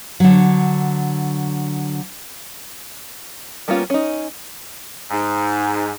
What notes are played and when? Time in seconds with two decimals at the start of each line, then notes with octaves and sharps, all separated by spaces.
0.20 D3 F#3
3.68 G3 A#3 B3 C#4 F4
3.90 C#4 D#4
5.10 G#2